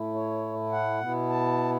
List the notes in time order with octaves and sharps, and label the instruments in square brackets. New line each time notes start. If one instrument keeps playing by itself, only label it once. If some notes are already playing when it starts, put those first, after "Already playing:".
Already playing: [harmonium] A2 A3 E4
C#5
F#5
B2 B3 E4
A5